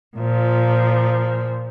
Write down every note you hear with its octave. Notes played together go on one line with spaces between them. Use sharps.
A#2 F3